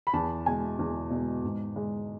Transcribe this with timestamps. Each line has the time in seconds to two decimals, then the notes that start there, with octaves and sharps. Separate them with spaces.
0.07 B5
0.13 E2 A5
0.46 B2 G#3 G#5
0.79 E2
1.10 B2 G#3
1.44 G#2
1.76 G#3